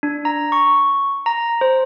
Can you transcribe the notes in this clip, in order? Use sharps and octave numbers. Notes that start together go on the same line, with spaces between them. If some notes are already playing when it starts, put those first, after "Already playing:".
D4
A#5
C#6
A#5
C5